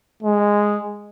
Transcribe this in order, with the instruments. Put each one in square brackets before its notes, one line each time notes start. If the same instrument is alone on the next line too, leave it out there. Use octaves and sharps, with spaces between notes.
[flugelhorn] G#3